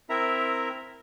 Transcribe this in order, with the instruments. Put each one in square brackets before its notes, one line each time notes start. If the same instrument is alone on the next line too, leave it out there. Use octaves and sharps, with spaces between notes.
[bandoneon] C4 E4 A#4 E5 A#5